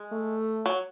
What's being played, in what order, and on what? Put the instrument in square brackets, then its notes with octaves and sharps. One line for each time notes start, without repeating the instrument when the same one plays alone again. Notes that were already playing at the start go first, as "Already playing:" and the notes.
Already playing: [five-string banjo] G#3
[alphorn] A3
[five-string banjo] F#3